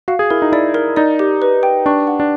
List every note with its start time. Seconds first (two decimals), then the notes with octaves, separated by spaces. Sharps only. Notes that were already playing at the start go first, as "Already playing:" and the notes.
0.08 F#4 F5
0.19 G#4
0.30 E4 A#4
0.42 D#4
0.52 E4 D5
0.74 A#4
0.96 D#4 D5
1.19 G4
1.42 B4
1.63 G5
1.86 D4 C#6
2.07 F#5
2.20 D4